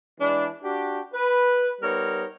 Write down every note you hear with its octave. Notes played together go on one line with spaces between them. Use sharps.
E3 G#3 D4
D4 F#4 G4
B4
G3 B3 D#4 A#4 C#5